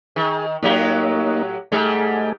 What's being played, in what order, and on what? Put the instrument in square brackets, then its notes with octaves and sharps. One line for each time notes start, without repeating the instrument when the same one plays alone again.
[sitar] D#3 [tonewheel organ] G#4
[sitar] A2 F#3 G4 [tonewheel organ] A#3 D#4
[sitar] G#2 G3 [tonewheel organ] A3 G#4